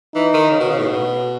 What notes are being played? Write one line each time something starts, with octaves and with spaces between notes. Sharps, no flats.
E3 D#4
D#3
C#3
B2
C#3
A2
B2